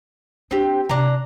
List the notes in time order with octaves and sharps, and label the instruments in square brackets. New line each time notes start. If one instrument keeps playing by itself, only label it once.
[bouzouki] C4 G4 [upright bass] D4
[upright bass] C3 [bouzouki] D4 A#5